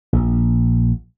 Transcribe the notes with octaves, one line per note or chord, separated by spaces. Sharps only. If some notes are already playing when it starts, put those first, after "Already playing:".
A#1